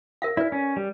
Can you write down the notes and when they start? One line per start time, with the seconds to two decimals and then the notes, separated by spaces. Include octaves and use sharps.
0.22 A#4 E5 F5
0.37 E4 B4 D5
0.52 C#4
0.77 G3